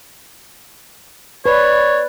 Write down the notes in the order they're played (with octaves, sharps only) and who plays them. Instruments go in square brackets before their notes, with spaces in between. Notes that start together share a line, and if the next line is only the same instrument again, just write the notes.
[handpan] B4 [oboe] C#5 [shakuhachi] D5